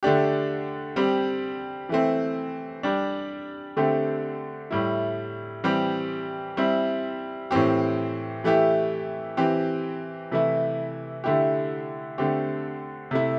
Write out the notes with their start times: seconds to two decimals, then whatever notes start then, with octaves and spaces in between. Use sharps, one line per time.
0.03 D3 A3 D4 G4
0.96 G3 C4 G4
1.89 E3 A3 C4
2.83 G3 D4 G4
3.77 D3 A3 C4 G4
4.71 A2 G3 E4
5.64 E3 G3 C4 G4
6.57 G3 C4 E4
7.51 A2 E3 C4 G4
8.44 E3 A3 E4 G4
9.37 E3 C4 G4
10.31 C3 E3 A3 E4
11.24 D3 A3 E4 G4
12.18 D3 A3 C4 G4
13.11 C3 A3 E4